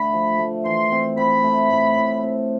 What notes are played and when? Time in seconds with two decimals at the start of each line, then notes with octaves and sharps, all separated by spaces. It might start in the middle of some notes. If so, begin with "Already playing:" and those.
Already playing: D3 A3 B5
0.13 F3
0.39 A3
0.65 E3 C6
0.92 C4
1.17 C4 B5
1.44 A3
1.70 A2
1.97 A2
2.23 C4